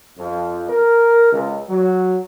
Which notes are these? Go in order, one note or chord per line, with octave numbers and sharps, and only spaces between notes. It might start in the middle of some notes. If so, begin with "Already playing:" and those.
F2
A#4
C#2
F#3